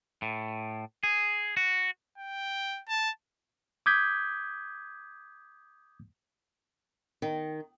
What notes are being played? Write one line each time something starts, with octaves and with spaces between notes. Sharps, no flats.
A2
G#4
F#4
G5
A5
D6 D#6 G6 G#6 B6
D#3